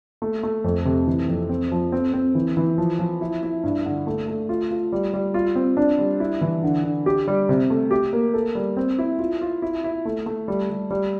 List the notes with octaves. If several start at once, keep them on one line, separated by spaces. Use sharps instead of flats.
A3
A3
F2
C3
E3
F2
C4
F3
C4
C4
E3
E3
F3
F3
E4
E4
G2
D3
A3
A3
F4
F4
G3
G3
F4
C4
D4
G3
E4
E3
D3
D3
G4
G3
C3
A3
G4
A#3
A4
G3
C4
E4
F4
F4
E4
E4
A3
A3
G3
G3
G3